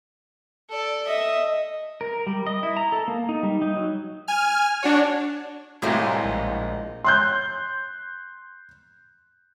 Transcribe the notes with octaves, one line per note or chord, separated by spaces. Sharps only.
A4 D5
D#5 E5
A#4
G3
D#5
E4
A#5
A4
A#3
D#4
G3
D#4
F#3
G#5 F6
D4 F#4 C#5
C2 A2 G#3 A#3 C5
A#1
C6 F#6 G6